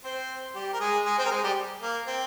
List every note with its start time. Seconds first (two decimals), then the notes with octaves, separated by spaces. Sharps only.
0.04 C4 C5
0.55 G3 G4
0.73 A#4
0.80 G#3 G#4
1.05 G#3 G#4
1.18 C4 C5
1.26 A#4
1.31 G#3 G#4
1.44 G3 G4
1.82 A#3
2.07 C4